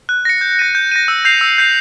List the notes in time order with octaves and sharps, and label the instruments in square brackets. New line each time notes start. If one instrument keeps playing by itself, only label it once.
[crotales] F#6
A#6 C#7
G6
A#6 D#7
G6
A#6 D#7
E6
G6 C7 F7
E6
G6 C7 F7